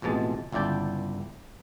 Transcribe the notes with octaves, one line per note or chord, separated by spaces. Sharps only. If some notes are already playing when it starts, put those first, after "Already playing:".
A1 F2 B2 G#3 A5
G1 C#2 E4 D5 G5 A5